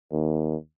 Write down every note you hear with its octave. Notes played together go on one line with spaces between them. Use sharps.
D#2